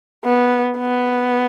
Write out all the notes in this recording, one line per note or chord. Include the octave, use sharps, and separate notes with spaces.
B3
B3